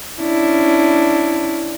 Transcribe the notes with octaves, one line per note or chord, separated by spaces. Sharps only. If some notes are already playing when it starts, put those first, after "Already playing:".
C#4 D4 E4